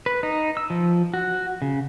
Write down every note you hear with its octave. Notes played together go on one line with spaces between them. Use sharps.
B4
D#4
E6
F3
F#4
C#3